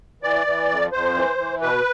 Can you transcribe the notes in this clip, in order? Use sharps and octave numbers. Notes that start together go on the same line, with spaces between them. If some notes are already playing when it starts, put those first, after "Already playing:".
E3 D5
E3
F2
F2 C5
E3
E3
B2 B4